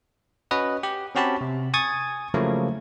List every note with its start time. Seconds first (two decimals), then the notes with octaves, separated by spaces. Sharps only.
0.51 C#4 F#4 B4 D#5
0.83 G4
1.15 C4 C#4 F#4 G4 A5 B5
1.41 C3
1.74 G#5 C#6 D#6 G#6 A6
2.34 C#3 F3 F#3 A3 A#3 E4